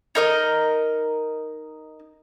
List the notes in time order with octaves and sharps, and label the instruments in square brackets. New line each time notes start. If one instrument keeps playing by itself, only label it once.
[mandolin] D#4 A#4 D#5